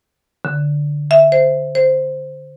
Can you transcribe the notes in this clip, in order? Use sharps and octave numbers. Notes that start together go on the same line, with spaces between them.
D3
E5
C5
C5